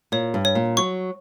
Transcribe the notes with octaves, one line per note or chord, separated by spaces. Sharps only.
A#2 C#5
G2
C#5
A#2
F#3 C#6